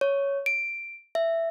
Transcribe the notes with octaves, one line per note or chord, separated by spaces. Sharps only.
C#5
D7
E5